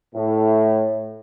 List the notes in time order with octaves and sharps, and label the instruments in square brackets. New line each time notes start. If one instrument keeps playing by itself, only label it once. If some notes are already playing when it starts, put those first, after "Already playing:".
[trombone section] A2